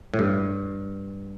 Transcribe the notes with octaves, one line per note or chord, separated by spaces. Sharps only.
A2
G2